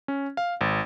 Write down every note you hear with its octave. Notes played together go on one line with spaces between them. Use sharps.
C#4
F5
G#1